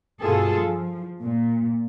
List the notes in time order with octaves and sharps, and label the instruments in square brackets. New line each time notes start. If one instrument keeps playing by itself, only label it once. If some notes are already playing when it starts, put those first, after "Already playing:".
[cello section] G2 B2 F4 G#4 A4
F3
A#2